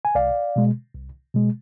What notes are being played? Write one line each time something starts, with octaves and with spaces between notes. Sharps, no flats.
G#5
C2 D5 F5
B2 G#3
C2
B2 G#3